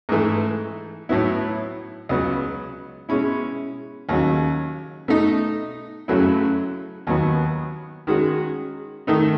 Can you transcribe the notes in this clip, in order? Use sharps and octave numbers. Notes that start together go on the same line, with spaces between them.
G#2 E3 A3
A2 F#3 B3 E4
C#2 C#3 F#3 B3
B2 G#3 C#4 E4
D#2 C#3 F#3
B2 A3 D#4
F#2 C#3 F#3 A3 E4
D#2 D#3 F#3 B3
D#3 G#3 C#4 F#4
D#3 A3 D#4